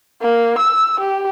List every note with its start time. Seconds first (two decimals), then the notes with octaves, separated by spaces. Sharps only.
0.22 A#3
0.58 E6
1.00 G4